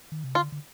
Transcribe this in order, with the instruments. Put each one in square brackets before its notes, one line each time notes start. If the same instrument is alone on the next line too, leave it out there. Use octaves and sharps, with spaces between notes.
[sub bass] D#3
C3
[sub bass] D3 [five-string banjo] F4
[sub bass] D3